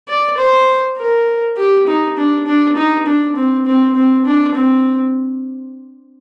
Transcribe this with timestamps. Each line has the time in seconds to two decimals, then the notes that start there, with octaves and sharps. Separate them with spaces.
0.08 D5
0.38 C5
0.98 A#4
1.57 G4
1.87 D#4
2.17 D4
2.46 D4
2.76 D#4
3.06 D4
3.36 C4
3.66 C4
3.95 C4
4.25 D4
4.55 C4